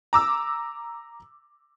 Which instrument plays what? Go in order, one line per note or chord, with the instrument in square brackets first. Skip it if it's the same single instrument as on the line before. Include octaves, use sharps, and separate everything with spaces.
[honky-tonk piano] A#5 D6 E6